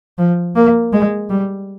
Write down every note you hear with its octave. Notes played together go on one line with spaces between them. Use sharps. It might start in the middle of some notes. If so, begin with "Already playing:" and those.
F3
A#3
G#3
G3